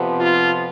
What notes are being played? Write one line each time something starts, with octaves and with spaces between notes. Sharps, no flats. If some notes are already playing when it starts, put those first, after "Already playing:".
Already playing: F2 C3 F3 B3
F4